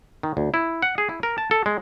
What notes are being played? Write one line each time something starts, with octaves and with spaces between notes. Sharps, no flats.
D#3
D2
E4
F#5
G#4
E4
A#4
A5
A4
G#3